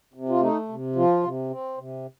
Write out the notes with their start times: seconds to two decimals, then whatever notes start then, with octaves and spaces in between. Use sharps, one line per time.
0.14 C3
0.29 F4
0.41 A3 D#4
0.69 C3
0.95 F3 F4
1.23 C3
1.50 C4
1.78 C3